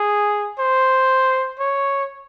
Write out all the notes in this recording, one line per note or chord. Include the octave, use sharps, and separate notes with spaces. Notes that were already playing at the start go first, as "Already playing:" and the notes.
Already playing: G#4
C5
C#5